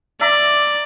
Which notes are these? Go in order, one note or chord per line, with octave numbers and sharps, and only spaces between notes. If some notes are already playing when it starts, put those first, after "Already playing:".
D5 E5 A#5 D6